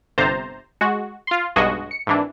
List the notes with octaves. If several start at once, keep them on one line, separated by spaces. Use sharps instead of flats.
G1 C3 C5 A#5 A6
G#3 F#4
F4 C6
B1 G2 G#3 F#4 D#5
C#7
G#1 E3 D4